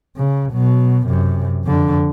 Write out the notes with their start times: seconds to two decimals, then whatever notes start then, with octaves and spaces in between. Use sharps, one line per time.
0.17 C#3
0.52 B2 F#3
1.06 F#2 C3
1.64 F2 D3